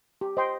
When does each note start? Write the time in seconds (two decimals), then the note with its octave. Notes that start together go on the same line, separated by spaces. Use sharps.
0.21 G4
0.37 C5 D#5 G5 C6